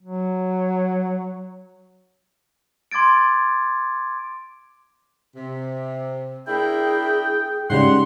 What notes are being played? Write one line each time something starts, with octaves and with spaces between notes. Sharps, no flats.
F#3
C6 D6 G#6 A6 D7
C3
A#3 D4 E4 G#4 G5
G#2 C#3 G3 F#5 C6